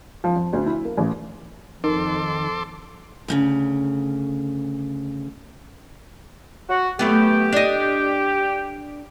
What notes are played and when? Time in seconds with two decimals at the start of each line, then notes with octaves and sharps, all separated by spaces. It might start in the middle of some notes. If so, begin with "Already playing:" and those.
0.24 F3
0.36 F2
0.53 D2
0.66 E4
0.85 A#3
0.97 A1
1.84 F2 D#3 A4 C6 D6
3.28 D2 A#2 C#3
6.69 F#4
6.99 F#2 A3 B3 G4
7.53 D4 D#5